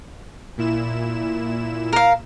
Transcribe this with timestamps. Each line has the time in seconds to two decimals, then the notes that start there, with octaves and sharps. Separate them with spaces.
0.57 A#2 E4 E7
1.93 A#4 F5